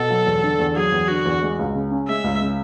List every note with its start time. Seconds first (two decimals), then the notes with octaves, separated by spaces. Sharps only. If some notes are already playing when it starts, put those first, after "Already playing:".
Already playing: B2 A4
0.10 F#3
0.26 E2
0.43 D3
0.60 E2
0.76 F#3 G#4
0.92 E2
1.09 D3 F#4
1.25 E2
1.42 G#3
1.59 C#2
1.75 C#3
1.91 C#4
2.08 G#3 E5
2.24 C#2
2.41 C#3